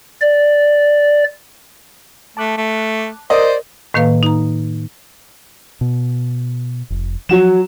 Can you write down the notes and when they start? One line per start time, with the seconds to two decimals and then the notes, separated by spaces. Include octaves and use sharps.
0.21 D5
2.37 A3 A5 D6 F#6
2.58 A3
3.30 A#4 C5 D5 D#5
3.94 A2 D#3 A#3 B4 F5
4.23 D#4 A#5
5.81 B2
6.90 F1
7.29 F3 F#3 F#4 E7